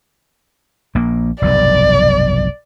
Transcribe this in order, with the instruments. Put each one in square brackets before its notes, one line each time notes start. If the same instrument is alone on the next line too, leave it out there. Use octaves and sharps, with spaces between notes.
[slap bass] A#1 A#3
[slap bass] F1 B1 G2 [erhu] D5